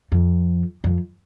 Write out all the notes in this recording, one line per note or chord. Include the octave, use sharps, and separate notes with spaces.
F2
F2